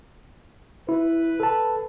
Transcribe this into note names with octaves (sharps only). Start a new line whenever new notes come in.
E4 B4
A4 A5